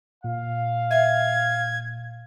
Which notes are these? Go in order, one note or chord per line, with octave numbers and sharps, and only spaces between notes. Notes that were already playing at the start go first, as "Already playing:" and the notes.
A#2 F5
E5 G#6